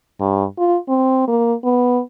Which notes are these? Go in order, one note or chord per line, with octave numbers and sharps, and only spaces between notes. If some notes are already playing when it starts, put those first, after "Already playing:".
G2
F4
C4
A#3
B3